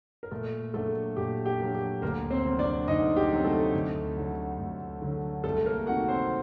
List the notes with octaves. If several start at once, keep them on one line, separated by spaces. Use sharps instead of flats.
A#4
A#2 A3 A4
F#3 A3 A#3 D4 A4
A#2 G4
G4
F#3 A#3 D4
G4
D2 A#3 A#4
C4 C5
C3 F#3 C4
D4 D5
D2 D#4 D#5
G4
C3 F#3 C4
A3 A4
D2
D3 F#3
D2
D3 F#3
C2 A3 A4
A#3 A#4
C3 D#3 F#4 F#5
C4 C5